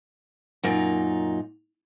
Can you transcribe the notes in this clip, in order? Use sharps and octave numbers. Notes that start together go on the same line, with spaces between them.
F#2 A#2 D#4